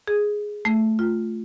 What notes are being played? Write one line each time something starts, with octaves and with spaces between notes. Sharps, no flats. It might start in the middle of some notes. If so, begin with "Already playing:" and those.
G#4
A3
F4